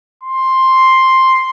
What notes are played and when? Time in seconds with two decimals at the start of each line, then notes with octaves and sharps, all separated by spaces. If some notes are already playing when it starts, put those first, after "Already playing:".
0.23 C6